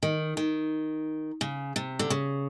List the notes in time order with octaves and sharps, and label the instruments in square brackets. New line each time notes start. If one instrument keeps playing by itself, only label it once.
[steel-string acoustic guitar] D#3
D#3
C#3
C3
D3
C#3